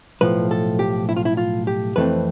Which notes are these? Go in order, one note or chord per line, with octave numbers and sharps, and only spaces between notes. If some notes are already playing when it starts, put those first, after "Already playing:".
B1 A2 F3 B4
A4
G4
E4
F4
E4
F4
G4
F2 E3 A3 C4 B4